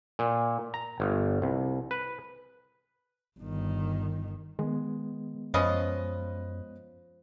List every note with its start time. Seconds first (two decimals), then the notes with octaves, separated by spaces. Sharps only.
0.19 A#2
0.74 A#5
1.00 G1
1.42 C2
1.91 B4
3.40 G1 D#3
4.59 D#3 G#3 B3
5.54 F#2 F3 C#4 B4 D#5 D#6